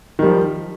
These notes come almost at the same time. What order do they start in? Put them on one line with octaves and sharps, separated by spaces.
D#3 G3 F3